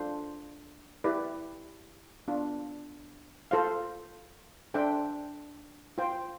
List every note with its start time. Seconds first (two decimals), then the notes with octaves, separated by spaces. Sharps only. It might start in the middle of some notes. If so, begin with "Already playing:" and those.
Already playing: D4 F4 A4 C5
1.04 E4 G4 B4 D5
2.28 B3 D4 F4
3.51 F4 A4 C5 F5
4.74 D4 A4 C5 E5 G5
5.98 F4 C5 G5